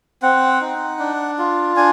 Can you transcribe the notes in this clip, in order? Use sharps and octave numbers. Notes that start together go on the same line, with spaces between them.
C4 F#5
D#4
D4
F4
D4 G#5